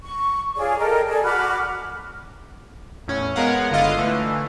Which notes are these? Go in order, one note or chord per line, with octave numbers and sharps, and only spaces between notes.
C#6
F4 G#4 C#5 D5
A4 A#4 D#5 G5
G#4 A4 D5
F#4 B5 D6 F6
E2 A2 C#4
G#3 B3 A#4 C#5 F5 F#5
G1 D3 E4 F4 D#5 F5
D3 E3 A3